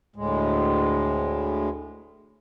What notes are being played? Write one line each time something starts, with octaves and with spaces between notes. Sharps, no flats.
D2 A2 G#3